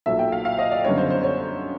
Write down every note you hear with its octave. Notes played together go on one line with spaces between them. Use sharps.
B1 A#2 F#3 E5
G5
F5
F5
D#5
D5
F#2 D3 G3 B3 D#4 C#5
C5
C5
C#5